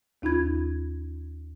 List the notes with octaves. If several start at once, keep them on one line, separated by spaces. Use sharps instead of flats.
D#2 D#4 F4 B5 G#6